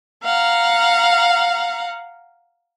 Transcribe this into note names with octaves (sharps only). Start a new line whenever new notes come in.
F5 F#5 A#5